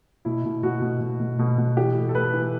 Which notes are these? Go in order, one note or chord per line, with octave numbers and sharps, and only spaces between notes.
B2 E4
B2
B2 F#4
B2
B2
B2
B2
B2
E3 G4
A2
A4
A2 B4
E3